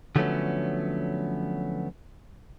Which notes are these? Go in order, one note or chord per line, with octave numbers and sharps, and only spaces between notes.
D3 F3 F#3 A3 B3 C#4